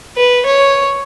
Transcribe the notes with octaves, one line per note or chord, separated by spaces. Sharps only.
B4
C#5